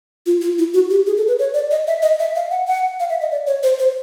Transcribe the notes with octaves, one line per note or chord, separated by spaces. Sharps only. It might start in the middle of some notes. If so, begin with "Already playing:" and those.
F4
F4
E4
F#4
G4
G#4
A4
B4
C#5
D5
D#5
E5
D#5
E5
F5
F#5
F#5
F5
E5
D#5
D5
C#5
C5
C5